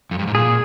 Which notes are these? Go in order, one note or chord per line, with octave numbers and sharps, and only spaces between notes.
F2
G2
G#2
A#2 G#4